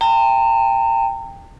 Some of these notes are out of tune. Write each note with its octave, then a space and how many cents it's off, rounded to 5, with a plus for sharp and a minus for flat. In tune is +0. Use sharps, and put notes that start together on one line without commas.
G5 +15 A#5 -40